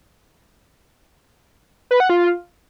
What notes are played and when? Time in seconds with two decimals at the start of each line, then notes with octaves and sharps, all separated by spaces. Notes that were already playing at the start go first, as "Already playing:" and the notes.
1.91 B4
2.00 F#5
2.10 F4